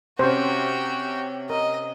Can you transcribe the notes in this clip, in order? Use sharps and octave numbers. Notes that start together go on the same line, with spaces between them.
C3 C#4 F#4 G4 C5
A#4 D#5